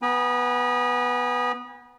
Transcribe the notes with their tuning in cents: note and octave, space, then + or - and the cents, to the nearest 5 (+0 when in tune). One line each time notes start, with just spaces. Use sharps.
B3 +0 G#5 -35 B5 -45